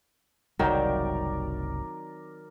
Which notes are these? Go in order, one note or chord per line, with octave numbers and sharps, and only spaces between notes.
F#1 C2 D#3 F#3 G3 C4 A#4 D5